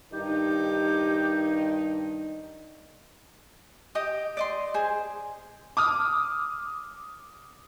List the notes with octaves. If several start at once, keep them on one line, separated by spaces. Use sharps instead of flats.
G2 D#3 D#4 G4
G4 D#5 D#6
D5 D#5 C6
G#4 C5
D6 D#6 F6